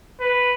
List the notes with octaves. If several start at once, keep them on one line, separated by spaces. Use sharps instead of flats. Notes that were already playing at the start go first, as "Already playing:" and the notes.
B4